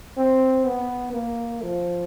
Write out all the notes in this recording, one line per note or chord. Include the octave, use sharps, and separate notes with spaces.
C4
B3
A#3
F3